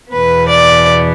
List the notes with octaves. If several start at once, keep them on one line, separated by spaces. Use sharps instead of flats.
E2 B2 B3 B4
D5